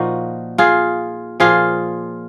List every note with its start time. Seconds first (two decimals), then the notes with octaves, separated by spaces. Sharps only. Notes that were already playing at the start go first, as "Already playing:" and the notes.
Already playing: A#2 F3 D#4 F#4
0.58 F4 G#4
1.40 A#2 F3 F4 G#4